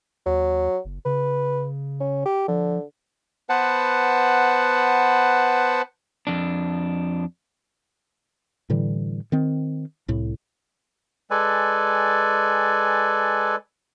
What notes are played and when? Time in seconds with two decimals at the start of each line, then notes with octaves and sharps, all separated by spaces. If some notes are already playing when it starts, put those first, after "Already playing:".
0.26 D#2 F#3
0.85 F#1
1.05 C#3 B4
2.00 C#4
2.25 G4
2.48 D3 F3
3.49 B3 B4 C5 F#5 A5
6.27 F2 D4
8.70 A2 D3 E3 G3
9.32 D#3 C4
10.08 C2 A2
11.31 G#3 A4 B4 D5 G#5